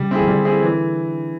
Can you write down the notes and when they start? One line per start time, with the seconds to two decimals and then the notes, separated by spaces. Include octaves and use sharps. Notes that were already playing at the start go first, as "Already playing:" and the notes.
Already playing: C#3 G3
0.11 C4 E4 G#4
0.21 D#3
0.27 D3 G3
0.45 C4 E4 G#4
0.62 E3